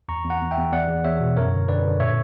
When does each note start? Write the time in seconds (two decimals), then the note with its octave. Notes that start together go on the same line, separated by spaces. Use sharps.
0.08 E2 A#5 C#6
0.25 E2
0.30 F#5 A#5
0.41 E2
0.51 E5 G5
0.57 E2
0.72 E2 D5 F#5
0.88 E2
1.04 E2 C#5 E5
1.20 B2
1.36 F#2 A#4 C#5
1.53 D3
1.68 D3 B4 D5
1.84 D3
2.00 A#2 C#5 E5